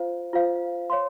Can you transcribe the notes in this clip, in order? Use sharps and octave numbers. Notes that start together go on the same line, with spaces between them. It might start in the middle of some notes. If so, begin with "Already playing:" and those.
Already playing: F4 C5 F5
F4 C5 F5
C#5 F5 C6